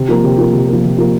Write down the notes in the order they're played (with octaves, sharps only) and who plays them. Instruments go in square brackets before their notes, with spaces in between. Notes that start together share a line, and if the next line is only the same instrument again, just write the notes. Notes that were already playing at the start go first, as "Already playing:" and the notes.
Already playing: [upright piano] C3
F3 A#3
C3
F3 A#3
C3
F3 A#3
C3
F3 A#3